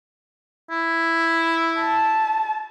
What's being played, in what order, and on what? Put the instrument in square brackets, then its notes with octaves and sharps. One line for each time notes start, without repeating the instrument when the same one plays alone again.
[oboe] E4
[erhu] A5